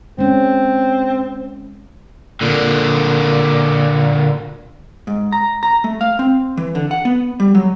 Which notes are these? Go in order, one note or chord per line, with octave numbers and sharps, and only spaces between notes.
G#3 C4 C#4
A#2 D3
G#2
A#5
A#5
A3
F5
C4
E3
D3
F#5
B3
G3
F#3